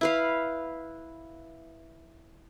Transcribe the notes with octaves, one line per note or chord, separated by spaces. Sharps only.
E4 B4 F5